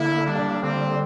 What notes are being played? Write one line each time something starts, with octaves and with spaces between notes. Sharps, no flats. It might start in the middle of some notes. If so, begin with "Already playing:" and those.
Already playing: D3 A#3 E4
G3 D4
D3 C4